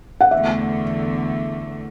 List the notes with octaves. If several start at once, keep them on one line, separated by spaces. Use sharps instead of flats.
F#5
E2 D3 A3 E5